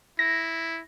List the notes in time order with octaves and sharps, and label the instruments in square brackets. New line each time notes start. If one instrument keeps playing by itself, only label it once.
[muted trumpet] E4 [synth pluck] A#6